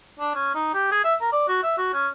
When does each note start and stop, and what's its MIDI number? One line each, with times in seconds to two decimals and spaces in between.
0.19 0.32 62
0.35 0.53 61
0.55 0.70 63
0.74 0.88 67
0.91 1.02 68
1.04 1.14 76
1.21 1.30 70
1.33 1.45 74
1.48 1.60 66
1.63 1.75 76
1.78 1.93 66
1.93 2.08 61